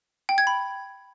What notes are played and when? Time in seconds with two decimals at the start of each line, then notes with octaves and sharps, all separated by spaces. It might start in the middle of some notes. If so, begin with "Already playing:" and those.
0.29 G5
0.38 G#6
0.47 B5